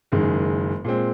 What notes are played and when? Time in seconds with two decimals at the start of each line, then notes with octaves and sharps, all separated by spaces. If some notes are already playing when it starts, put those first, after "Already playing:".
0.12 F#1 F#2 D#3 G#3
0.84 A#2 G#3 C4